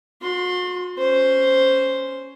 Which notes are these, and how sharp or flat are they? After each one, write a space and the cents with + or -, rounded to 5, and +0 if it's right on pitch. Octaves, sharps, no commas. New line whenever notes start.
F#4 -45 C6 +0
C#4 +0 C5 +0